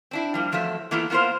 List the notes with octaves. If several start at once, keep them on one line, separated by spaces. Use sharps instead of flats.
C4 D4 E4
F3 G3 A#3
E2 F3 F#3 A3 E5
E3 A#3 B3 E4 F4 A4
A#3 B3 F4 A#4 C5